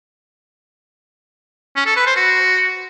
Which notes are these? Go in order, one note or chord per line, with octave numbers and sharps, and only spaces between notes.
C#4
A4
B4
C5
F#4